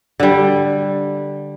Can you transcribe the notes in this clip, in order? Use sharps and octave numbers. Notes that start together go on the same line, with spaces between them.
D3 G3